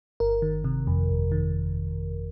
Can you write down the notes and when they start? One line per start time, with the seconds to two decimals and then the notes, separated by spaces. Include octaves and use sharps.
0.20 G1 A#4
0.42 D#3
0.64 C3
0.87 F2
1.09 G1
1.32 D#3